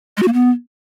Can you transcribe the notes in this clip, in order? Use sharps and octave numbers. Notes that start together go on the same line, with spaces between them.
G#3
F#4
A#3
B3